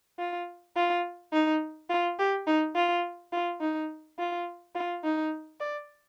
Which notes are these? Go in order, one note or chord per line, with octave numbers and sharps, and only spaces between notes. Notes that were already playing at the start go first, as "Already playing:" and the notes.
F4
F4
D#4
F4
G4
D#4
F4
F4
D#4
F4
F4
D#4
D5